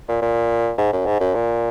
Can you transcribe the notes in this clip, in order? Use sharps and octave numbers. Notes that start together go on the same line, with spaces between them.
A#2
A#2
G#2
F#2
G#2
F#2
A#2